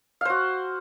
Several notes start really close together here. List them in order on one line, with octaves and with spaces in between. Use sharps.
F5 C5 F#4